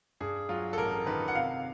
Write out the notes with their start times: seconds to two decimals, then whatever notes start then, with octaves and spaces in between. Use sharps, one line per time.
0.20 G2 G#4
0.49 F#3 F4
0.73 A4
0.78 A1 A#4
1.06 D#3 B4
1.28 F#5
1.35 C3 F5